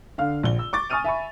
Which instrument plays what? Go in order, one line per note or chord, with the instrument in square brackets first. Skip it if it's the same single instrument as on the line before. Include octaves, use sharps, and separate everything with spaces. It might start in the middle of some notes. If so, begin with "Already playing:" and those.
[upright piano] D3 F5 F6
A#1 G7
E6
C#6 D6 A6
G#5 C#6 D#6 F6 D#7 F7
E5 G#5 B5 C#6